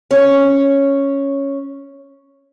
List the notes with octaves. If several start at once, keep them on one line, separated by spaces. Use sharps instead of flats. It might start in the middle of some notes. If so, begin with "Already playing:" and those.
C#4 C#5